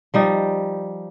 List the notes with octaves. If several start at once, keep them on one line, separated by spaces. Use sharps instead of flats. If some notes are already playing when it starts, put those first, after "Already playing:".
F3 G3 D#4